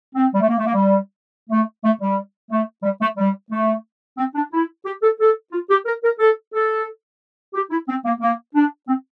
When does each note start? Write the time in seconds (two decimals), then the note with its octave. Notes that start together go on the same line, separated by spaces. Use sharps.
0.15 C4
0.33 G3
0.40 A3
0.48 A#3
0.57 A3
0.66 A#3
0.74 G3
1.50 A3
1.83 A3
2.00 G3
2.50 A3
2.83 G3
3.00 A3
3.17 G3
3.51 A3
4.18 C4
4.35 D4
4.52 E4
4.85 G4
5.02 A4
5.19 A4
5.52 F4
5.70 G4
5.85 A#4
6.03 A#4
6.19 A4
6.53 A4
7.54 G4
7.70 E4
7.88 C4
8.04 A#3
8.20 A#3
8.55 D4
8.88 C4